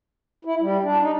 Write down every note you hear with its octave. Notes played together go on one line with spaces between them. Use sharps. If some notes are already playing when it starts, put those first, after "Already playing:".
E4
G3
D4
D#4